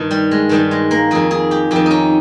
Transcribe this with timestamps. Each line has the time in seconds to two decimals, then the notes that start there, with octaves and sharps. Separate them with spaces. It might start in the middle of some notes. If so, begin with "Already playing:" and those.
Already playing: G2 D#3
0.11 G3
0.31 G#3
0.49 G2 D#3 G3
0.71 G#3
0.91 A#3
1.11 F2 D#3 G#4
1.31 G#4
1.51 G4
1.71 F2 D#3 G4
1.86 C#4 D#4